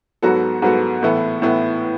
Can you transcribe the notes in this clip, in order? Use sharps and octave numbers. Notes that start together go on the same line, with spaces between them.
G#2 F#3 B3 F#4 A4
G#2 F#3 B3 F#4 A4
A2 E3 B3 E4 A4
A2 E3 B3 E4 A4